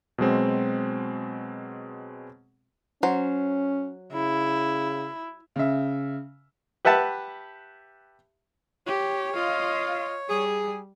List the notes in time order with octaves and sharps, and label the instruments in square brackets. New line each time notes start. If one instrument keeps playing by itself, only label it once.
[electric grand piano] B2 F#3 G#3 C4
[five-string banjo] F#3 C5 [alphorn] C#4
[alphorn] C#3 [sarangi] E4
[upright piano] C#3 E5
[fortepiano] G4 B4 E5 F#5 A5
[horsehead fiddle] G4 [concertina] C#5
[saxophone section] F4 [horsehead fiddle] D#5 F5
[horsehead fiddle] G3 [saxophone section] G#4